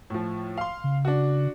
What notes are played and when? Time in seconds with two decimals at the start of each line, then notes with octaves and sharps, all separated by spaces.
0.10 A2 F3
0.57 F5 C6
0.84 C#3
1.05 D4 F#4